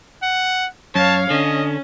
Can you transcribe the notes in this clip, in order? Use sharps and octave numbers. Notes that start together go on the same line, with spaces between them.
F#5
F#2 C#5 F5 A5
D3 C#4 D#5